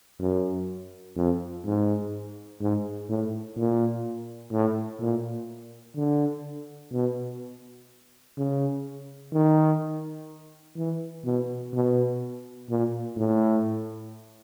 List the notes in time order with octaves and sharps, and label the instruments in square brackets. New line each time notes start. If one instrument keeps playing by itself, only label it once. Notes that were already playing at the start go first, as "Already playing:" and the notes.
[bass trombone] F#2
F2
G#2
G#2
A2
A#2
A2
A#2
D3
B2
C#3
D#3
E3
B2
B2
A#2
A2